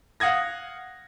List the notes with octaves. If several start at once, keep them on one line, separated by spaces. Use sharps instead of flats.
F5 F#5 D#6 G#6 A#6